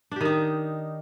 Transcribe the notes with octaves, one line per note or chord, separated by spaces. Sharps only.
D#3 D4 D#4 G4